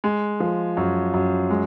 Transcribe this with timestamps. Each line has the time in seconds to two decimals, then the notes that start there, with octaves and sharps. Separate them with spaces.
0.04 G#3
0.40 F3
0.77 F#2
1.14 F#2
1.50 G#3